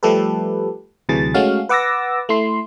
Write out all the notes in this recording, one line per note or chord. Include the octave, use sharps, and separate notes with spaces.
F3 G3 A3 G4 A4 B4
D2 C3 E3 F#3 G#4 A6
G#3 A3 C#4 F#4 F5
B4 F#5 D6 E6 A6 A#6
A3 E4 C6